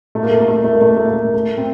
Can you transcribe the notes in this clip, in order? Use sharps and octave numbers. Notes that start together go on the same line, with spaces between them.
A3
A#3
A3
A#3
A3
A#3
A3
A#3
A3
A#3
A3
A#3
A3
A3
C4